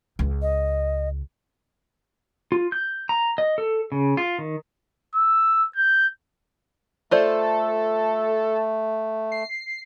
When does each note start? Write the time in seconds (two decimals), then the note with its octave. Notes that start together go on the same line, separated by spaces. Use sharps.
0.19 C#2
0.42 D#5
2.52 F4
2.72 G6
3.09 A#5
3.38 D#5
3.58 A4
3.92 C#3
4.17 F4
4.39 D#3
5.15 E6
5.76 G6
7.11 A3 F4 A4 C5 D5
9.32 C7